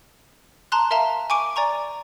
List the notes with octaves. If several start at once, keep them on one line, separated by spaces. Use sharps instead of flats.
A5 A#5 C6 F#6
A#4 E5 F5 A5 A#5
G#5 C#6 D6 D7 D#7
D5 G#5 A#5 C#6